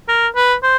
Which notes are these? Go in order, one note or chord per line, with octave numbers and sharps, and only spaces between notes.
A#4
B4
C5